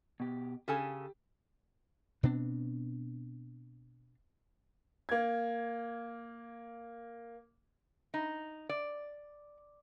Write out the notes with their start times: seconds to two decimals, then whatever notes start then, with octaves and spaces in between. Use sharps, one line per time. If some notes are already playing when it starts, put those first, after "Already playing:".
0.20 B2 G4
0.68 C#3 G4 A4 G#5
2.23 B2 B3 C4 D4
5.09 A#3 G#6
8.14 D#4
8.69 D5